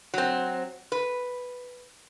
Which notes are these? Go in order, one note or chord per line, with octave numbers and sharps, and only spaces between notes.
F#3 C4
B4